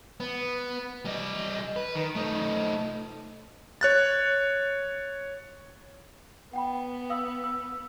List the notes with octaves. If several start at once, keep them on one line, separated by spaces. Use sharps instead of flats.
B3
G3 D#5
B4
D#3
A3 D#4
C#5 F#6 A6
B3 F#5 G5 B5
F5 D#6 E6
E6